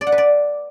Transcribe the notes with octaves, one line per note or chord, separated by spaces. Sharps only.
D5
F#5
B4
D5